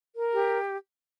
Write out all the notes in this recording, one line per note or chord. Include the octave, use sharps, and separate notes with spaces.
A#4
G4